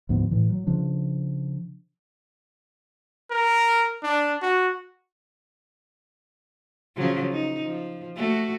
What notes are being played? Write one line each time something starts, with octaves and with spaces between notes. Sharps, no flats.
D2 G#2 F3 B3
A2 E3
F#3
C#3 F3 D4
A#4
D4
F#4
C#3 F3 F#3
D#4
F3
A3 F#4